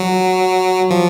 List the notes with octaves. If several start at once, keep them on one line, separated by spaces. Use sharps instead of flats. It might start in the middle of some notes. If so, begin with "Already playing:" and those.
Already playing: F#3
F3